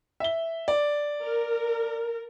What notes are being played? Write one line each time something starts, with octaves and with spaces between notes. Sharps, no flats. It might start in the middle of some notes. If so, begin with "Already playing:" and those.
E5 G7
D5
A#4